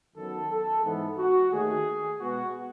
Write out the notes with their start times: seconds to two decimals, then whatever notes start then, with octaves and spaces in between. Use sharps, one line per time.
0.16 F#2 D#3 F#3 B3 A4
0.50 A4
0.84 G#2 E3 B3
1.18 F#4
1.52 D#2 D#3 A3 G#4
2.19 B2 G#3 B3 F#4